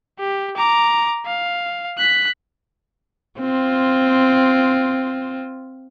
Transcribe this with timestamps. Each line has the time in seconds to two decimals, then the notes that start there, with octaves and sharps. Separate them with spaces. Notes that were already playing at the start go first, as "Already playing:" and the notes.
0.19 G4
0.57 A#5 D6
1.26 F5
1.98 F#6 B6
3.39 C4 F4